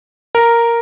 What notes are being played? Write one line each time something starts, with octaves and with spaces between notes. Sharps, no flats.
A#4